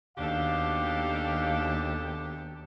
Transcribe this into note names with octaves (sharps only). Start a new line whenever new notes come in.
D#2 B2 D4 G4 A4 F5